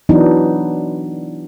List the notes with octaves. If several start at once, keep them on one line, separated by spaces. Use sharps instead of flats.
E3 F#3 B3 D4 D#4